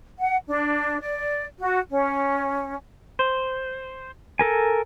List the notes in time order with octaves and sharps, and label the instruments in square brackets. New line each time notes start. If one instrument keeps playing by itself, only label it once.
[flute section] F#5
D4
D5
F#4
C#4
[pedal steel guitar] C5
A4 A#4 G#5